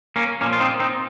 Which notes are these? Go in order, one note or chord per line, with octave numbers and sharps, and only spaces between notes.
A#3 C#4
A#2 F3 A#3 C#4
F4
C4 D#4
C4 D#4